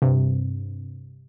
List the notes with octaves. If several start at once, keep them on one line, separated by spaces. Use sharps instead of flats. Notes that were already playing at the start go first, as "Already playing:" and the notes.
G2 C3